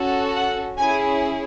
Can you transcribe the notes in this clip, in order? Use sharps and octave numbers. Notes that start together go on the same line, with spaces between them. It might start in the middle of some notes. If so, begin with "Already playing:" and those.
Already playing: C#4 F#4 A4
F#5
C#4 E4 G#4 G#5